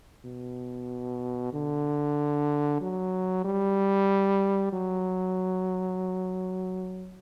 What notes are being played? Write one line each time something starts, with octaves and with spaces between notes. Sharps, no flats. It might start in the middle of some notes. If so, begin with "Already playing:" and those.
B2
D3
F#3
G3
F#3